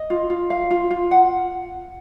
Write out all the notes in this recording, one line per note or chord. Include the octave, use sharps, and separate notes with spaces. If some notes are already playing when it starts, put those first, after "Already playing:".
Already playing: D#5
F4
F4
F5
F4
F4
F#5